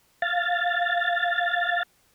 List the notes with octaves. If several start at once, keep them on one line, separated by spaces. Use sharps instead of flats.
F5 A6